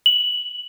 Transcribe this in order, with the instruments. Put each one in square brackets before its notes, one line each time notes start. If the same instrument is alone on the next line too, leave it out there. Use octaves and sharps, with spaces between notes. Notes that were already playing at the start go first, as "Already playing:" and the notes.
[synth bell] F#7